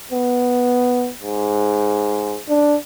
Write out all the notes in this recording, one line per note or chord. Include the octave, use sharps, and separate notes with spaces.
B3
G#2
D4